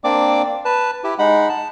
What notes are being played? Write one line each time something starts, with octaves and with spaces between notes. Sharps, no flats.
A#3 C4 D4 D5 D6
B4 A5
E4 G4
G#3 D#4 F#5 B5
A5